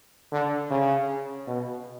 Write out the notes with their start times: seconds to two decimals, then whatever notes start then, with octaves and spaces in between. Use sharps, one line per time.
0.32 D3
0.70 C#3
1.48 B2